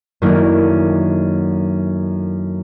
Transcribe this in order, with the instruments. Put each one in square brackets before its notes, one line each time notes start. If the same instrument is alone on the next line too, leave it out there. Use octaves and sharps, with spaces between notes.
[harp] F#2 D#3 A3 A#3 D4 E4